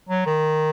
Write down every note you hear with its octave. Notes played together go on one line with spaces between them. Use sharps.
F#3
D#3